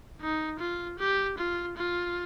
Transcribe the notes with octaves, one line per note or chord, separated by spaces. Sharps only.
D#4
F4
G4
F4
F4